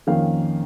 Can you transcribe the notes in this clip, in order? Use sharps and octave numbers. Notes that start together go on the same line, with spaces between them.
F2 D#3 A#3 C#4 F5